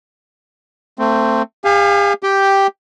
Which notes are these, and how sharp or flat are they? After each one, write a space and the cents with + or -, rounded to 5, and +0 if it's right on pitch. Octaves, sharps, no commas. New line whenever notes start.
A3 +25 C4 +0
G4 +45 F5 +0 G#5 +10
G4 +0 G5 +0